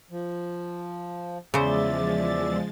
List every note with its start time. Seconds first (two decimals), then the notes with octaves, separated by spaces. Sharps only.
0.11 F3
1.54 E2 C#3 F3 G#3 C5 D5 E5 A6